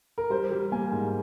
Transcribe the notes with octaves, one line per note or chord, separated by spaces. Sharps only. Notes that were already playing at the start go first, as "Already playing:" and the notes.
A#4
G3 C5
G3
A#3 G#5
G#2